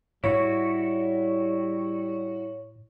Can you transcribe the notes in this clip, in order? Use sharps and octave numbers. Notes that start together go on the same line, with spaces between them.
A2 G3 E4 F#4 C#5